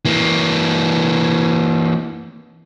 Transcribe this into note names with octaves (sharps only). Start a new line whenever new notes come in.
E3 A#3